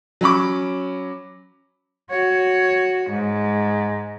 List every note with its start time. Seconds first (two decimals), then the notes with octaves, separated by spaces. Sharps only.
0.21 F#3 C#4 B5 D6
2.10 F#4 C#5
3.11 G#2